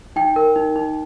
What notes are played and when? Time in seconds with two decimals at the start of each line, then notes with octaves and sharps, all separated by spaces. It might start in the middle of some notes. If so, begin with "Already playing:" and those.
0.16 D#4 G5
0.36 A#4
0.56 D#4
0.76 D#4